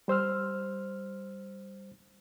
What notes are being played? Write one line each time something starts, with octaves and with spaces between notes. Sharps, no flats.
G3 C5 E6 F6